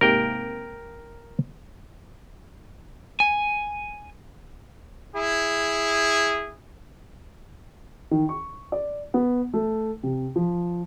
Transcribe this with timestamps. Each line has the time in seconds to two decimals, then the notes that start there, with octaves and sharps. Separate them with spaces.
0.01 G#2 C3 A#3 A#4 G5
3.20 G#5
5.16 E4 G#4
8.11 D#3
8.29 C#6
8.72 D5
9.14 B3
9.53 A3
10.03 C3
10.36 F3